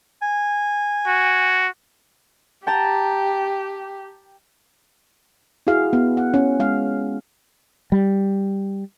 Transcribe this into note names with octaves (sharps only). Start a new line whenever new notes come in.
G#5
F#4
G4 G5 A5 A#5
E4 F#4 G#4 F5
B3
F#5
C#4
G#3 F5
G3